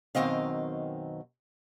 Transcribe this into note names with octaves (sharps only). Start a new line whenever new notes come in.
F#2 B2 D#3 C4 D#5 F5